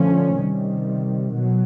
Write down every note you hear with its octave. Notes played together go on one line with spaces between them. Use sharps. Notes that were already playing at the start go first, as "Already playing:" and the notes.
Already playing: D3 F3 A3 C#4
C3 D#3 G3
B2 F#3